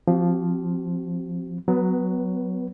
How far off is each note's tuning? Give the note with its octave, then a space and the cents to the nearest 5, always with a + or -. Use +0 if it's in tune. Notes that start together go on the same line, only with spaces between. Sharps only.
F3 +0 C4 +0 F#4 +45
F#3 +0 B3 +25 B4 -15